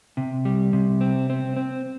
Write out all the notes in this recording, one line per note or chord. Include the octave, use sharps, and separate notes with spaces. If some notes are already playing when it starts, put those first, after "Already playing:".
C3
G3
C3
C4
C4
C4